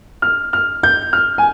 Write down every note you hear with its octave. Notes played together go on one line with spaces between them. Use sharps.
F6
F6
G6
F6
G#5